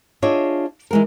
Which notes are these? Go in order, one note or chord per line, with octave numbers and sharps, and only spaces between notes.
D4 F4 G#4 C#5 D#5 E5
E3 G#3 A#4